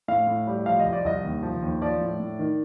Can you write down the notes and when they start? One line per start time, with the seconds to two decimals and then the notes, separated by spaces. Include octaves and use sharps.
0.08 A2 F5
0.27 A2
0.47 G3
0.66 F3 F5
0.79 D#5
0.85 C2
0.93 D5
1.05 C2 D#5
1.25 D#2
1.43 F3
1.62 D#2
1.82 F3 D5
2.01 A2
2.20 A2
2.39 D#3